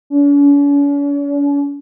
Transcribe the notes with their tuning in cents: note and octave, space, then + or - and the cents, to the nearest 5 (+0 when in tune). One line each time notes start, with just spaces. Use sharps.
C#4 +45